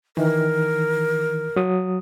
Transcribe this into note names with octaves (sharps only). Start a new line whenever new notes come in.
D#3 E3 A#4
F#3 D#6